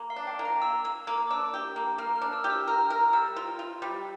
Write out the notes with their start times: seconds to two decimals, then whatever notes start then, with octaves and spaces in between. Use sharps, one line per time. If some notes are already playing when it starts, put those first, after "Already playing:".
Already playing: A#3
0.10 F5
0.16 D4
0.27 G5
0.39 A#3
0.45 A#5
0.62 A#3 E6
0.84 A#3 E6
1.07 A#3 D6
1.30 D4 E6
1.54 G4
1.76 A#3
1.98 A#3 F6
2.16 F6
2.21 D4
2.33 E6
2.44 G4
2.50 E6
2.67 A#4 F6
2.90 A#4
3.13 G3 E6
3.36 F4
3.59 F4
3.82 G3